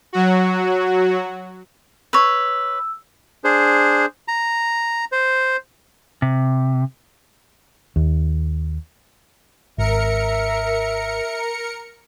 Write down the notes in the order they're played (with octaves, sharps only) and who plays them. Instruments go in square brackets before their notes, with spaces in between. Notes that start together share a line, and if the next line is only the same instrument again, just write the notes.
[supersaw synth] F#3 F#4
[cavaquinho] B4 C#5 [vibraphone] E6
[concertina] D4 G#4 C5
A#5
C5
[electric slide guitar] C3
[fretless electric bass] D#2
[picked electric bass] G#1 [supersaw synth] A#4 C#7 [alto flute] E5